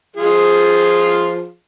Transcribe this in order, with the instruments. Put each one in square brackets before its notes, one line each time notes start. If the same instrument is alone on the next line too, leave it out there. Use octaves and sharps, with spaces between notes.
[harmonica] F3 F4 G#4